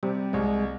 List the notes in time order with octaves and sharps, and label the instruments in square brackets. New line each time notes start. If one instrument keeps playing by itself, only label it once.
[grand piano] C3 [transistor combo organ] G3
[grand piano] C2 [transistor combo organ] G#3